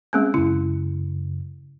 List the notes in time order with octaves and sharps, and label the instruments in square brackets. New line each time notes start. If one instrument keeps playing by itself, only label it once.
[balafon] G#3 A#3 C#4 [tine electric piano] C4 G#4
[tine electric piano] F#2 C#3 [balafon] E4